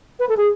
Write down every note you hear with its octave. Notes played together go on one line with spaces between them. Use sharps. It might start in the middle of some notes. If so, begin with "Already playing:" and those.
B4
A4
G#4